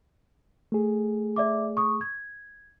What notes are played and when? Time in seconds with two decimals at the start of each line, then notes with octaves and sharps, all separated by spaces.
0.72 A3 G#4
1.36 D5 E5 D6
1.77 C#6 D#6
2.01 G#6